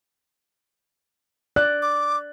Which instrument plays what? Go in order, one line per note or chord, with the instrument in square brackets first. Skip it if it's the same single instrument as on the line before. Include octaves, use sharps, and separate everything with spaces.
[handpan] D5 [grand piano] F#6
[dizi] D6